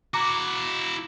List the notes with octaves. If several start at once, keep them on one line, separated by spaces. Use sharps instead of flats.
E4 F#4 A#5 D6